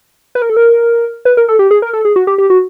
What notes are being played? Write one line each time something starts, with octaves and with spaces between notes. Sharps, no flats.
B4
A#4
A4
A#4
B4
A#4
A4
G4
G#4
A#4
A4
G#4
F#4
G4
G4
F#4